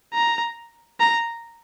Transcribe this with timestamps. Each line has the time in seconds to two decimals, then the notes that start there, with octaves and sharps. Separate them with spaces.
0.14 A#5
1.00 A#5